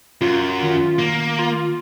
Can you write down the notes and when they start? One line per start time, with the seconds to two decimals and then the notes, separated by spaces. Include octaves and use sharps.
0.22 F#2 F4
0.63 D#3
0.99 A#3
1.39 F4